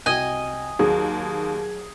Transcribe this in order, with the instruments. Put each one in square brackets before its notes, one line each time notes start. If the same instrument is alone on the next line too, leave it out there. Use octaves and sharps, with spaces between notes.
[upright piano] C2 F#4 G5 [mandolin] D#5 G#5
[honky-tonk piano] D#2 [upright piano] F#3 [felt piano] G#4